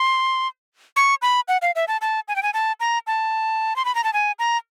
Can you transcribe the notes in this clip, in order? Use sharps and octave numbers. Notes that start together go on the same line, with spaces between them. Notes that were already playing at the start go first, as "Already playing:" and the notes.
Already playing: C6
C#6
B5
F#5
F5
E5
A5
A5
G#5
G5
G#5
A5
A#5
A5
C6
B5
A#5
A5
G#5
A#5